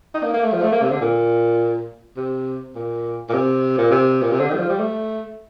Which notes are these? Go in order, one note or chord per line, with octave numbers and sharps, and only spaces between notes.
D#4
A#3
A#3
A3
F3
A3
A#3
C3
D3
A#2
C3
A#2
A#2
C3
A#2
C3
A#2
C3
D3
D#3
G3
F3
G3
A3